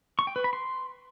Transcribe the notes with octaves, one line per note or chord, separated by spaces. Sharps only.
C#6
G5
B4
B5
C6